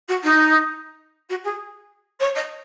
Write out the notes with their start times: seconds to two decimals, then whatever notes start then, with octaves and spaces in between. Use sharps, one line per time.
0.08 F#4
0.23 D#4
1.29 F#4
1.44 G#4
2.20 C#5
2.35 D#5